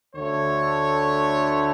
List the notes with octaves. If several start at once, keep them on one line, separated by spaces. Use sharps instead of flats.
D2 D3 A3 C#5